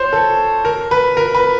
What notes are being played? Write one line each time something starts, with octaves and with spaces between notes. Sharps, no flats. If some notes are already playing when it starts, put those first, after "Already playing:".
Already playing: C5 C#5
A4
A#4
B4
A#4
B4